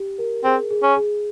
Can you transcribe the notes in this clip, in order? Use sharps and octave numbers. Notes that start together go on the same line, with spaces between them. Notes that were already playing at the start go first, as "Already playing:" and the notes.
Already playing: G4
A#4
C4 G#4
G#4
C#4
G#4